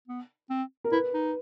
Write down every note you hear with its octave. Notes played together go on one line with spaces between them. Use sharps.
B3
C4
A#4
E4 B4
D#4